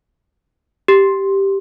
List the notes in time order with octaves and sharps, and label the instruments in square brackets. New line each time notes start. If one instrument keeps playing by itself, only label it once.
[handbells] G4